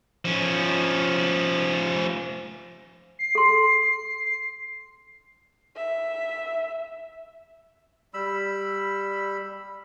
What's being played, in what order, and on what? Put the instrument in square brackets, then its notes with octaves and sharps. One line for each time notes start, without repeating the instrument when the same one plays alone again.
[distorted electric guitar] F3 C#4
[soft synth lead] C7
[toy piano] A4 C6
[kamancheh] E5
[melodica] G3 B5 E6